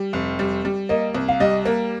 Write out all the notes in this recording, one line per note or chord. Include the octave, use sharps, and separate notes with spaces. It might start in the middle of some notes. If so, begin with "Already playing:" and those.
Already playing: G3
F1
G3
G3
A#3 D#5
C2
F5
G3 D#5
A#3